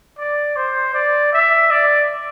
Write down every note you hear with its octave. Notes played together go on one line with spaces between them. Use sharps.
D5
C5
D5
E5
D5